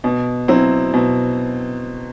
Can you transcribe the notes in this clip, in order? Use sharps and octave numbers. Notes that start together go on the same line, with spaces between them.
B2
F#3 C4 E4
B2